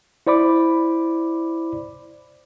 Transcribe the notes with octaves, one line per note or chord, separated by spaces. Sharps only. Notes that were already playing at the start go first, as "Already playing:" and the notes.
E4 C5 D5 B5 D6